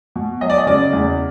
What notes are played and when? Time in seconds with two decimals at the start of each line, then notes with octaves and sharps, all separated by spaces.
0.16 B2
0.41 F#3 D#5
0.50 D5
0.58 D#5
0.67 C#3 D5
0.93 E2